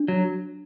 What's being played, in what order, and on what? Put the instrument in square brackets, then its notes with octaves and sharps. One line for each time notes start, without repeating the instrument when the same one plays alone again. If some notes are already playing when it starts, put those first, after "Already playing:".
Already playing: [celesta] D4
[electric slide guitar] F#3